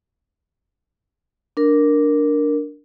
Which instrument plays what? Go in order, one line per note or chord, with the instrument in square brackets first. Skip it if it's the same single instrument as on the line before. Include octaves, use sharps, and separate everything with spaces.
[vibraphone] D4 A#4